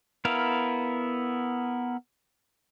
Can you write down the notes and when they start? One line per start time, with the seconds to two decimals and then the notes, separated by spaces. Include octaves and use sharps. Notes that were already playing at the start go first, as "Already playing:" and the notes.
0.25 B3 E4 A#4 F5